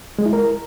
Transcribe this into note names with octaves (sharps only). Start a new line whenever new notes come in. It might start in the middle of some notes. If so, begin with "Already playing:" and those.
G#3
E4
A#4